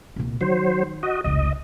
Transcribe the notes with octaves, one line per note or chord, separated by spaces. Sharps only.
C2 A#2
D#3 F#3 C5
F#4 D#5
F1 C#2 D#5